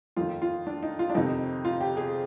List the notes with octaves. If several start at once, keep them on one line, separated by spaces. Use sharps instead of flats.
F2 D#3 F4
F4
D4
D#4
F4
D4
F2 C3 D#3 D#4
F4
G4
G#4